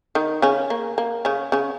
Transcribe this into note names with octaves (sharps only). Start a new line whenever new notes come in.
D#3 D#4
C#3 C#4
A#3
A#3
C#3 C#4
C#3 C#4